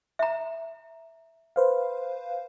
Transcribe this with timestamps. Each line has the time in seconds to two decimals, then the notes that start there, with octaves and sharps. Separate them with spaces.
0.19 E5 A#5
1.56 B4 C5 F5